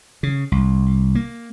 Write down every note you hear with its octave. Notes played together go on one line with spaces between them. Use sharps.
C#3
C2
A#3